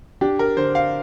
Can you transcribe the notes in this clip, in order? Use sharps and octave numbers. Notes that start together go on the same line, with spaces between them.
D4 G4
A#4
D3 C5
F5